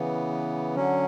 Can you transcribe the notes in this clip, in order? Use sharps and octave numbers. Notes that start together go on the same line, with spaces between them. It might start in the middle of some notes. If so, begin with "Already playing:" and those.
Already playing: C#3 E3 B3
D3 F#3 C#4